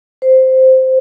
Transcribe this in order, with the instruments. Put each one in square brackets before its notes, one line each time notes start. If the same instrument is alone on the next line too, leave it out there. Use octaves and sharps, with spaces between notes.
[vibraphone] C5